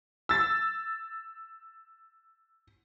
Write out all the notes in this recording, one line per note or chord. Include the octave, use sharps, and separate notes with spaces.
E6 A6